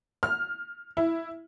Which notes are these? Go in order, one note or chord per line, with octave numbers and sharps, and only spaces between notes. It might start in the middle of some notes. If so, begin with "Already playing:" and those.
F6
E4